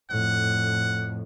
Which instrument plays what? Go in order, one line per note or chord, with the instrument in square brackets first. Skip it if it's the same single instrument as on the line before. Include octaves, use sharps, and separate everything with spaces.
[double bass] F2 A2 [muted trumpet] F#5